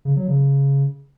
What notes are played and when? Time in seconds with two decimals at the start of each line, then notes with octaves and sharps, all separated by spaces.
0.05 C#3
0.16 F#3
0.28 C#3